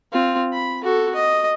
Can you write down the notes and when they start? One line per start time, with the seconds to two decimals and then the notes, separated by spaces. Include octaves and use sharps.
0.13 C4 F4
0.53 B5
0.84 F#4 A4
1.15 D#5